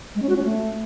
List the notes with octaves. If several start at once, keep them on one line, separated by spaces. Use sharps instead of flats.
G#3
C#4
F#4
C#4
A3